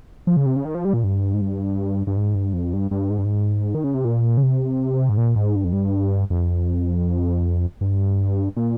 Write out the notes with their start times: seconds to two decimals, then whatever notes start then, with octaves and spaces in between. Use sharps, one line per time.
0.27 F3
0.37 C#3
0.46 C3
0.56 C#3
0.65 D#3
0.75 F3
0.85 G3
0.94 A#2
1.04 G2
1.34 G#2
1.41 G2
2.07 G2
2.17 G#2
2.35 G2
2.53 F2
2.73 G2
2.91 G2
3.10 G#2
3.18 G2
3.25 G#2
3.75 D#3
3.84 C#3
3.94 C3
4.05 A#2
4.37 C#3
4.43 C3
5.09 G#2
5.18 A#2
5.36 G#2
5.56 G2
5.64 F2
5.73 G2
6.30 F2
7.81 G2
8.57 A#2